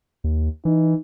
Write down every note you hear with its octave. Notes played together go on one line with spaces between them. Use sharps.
D#2
E3 D#4